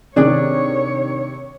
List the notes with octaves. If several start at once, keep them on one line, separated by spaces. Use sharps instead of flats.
C3 D#3 D4 G#4 C#5 D5